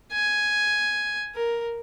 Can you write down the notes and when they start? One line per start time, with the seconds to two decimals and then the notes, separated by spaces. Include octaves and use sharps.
0.13 G#5
1.35 A#4